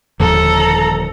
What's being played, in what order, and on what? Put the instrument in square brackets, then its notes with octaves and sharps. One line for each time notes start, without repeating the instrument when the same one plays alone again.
[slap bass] D#1 D3 F3 [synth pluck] D#2 D#3 [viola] A4 A#5